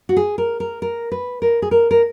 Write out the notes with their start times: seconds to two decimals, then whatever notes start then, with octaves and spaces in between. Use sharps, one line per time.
0.09 F#4
0.17 G#4
0.38 A#4
0.60 A#4
0.82 A#4
1.12 B4
1.42 A#4
1.62 G#4
1.71 A#4
1.91 A#4